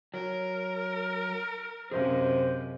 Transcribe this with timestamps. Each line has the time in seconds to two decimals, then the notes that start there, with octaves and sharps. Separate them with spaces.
0.14 F#3 A#4
1.91 F#2 C3 G#4 C5 D#5 F5